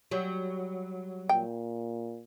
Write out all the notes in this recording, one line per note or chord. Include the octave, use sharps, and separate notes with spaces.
F#3 G3
A#2 G5